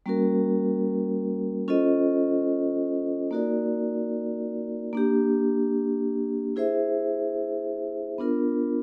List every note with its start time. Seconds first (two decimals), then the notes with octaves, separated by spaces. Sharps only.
0.06 G3 A#3 C#4 F#4 A#4
1.68 C#4 F4 A4 C5 D#5
3.31 A#3 D#4 F#4 A#4 D5
4.93 A#3 D4 G4
6.56 E4 G#4 C5 E5
8.18 B3 D4 F4 A#4